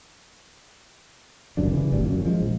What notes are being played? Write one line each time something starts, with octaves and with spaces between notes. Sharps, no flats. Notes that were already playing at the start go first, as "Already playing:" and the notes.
F#1 C2 F#2 D4
C#3 E3
G1 A2 D#3 G3
F#2 C#4
F3 G#3
A#1